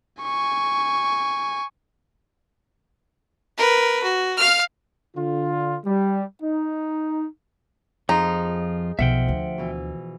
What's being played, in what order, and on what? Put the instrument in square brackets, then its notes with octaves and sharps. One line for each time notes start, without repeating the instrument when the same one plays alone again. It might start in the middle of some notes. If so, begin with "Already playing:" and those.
[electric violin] G#5 C#6
[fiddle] A#4 B4
F#4
F5 F6
[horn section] D3 F4
G3
D#4
[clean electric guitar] F2 F3 F4 [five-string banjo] D#4 [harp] G#4
[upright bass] B1 F2 [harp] F3 [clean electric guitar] E5 F#5 G5
[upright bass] D2 D3
[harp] B2 E3